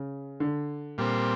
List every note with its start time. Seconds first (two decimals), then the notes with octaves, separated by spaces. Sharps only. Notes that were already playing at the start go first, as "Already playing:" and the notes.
Already playing: C#3
0.40 D3
0.98 A#2 G3 C4